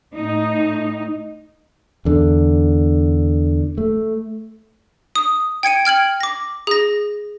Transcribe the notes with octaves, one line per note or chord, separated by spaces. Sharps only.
A2 D#4
E2 D3
A3
D#6
G5 G#6 C#7 D#7
G5 F6 G#6 F#7
D6 A#6
G#4 A#6